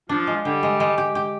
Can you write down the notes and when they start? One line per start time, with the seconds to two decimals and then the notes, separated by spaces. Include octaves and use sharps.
0.09 F3 D4 F4
0.27 G#3
0.44 D3 G3 G4
0.63 G#3
0.80 G#3
0.98 G4
1.15 G4